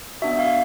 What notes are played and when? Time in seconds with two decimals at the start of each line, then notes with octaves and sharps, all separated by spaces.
0.22 B3 D4 F#4 E5
0.39 F5